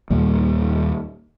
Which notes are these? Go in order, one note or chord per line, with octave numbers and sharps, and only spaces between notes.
D#2 A#2 G3 A#3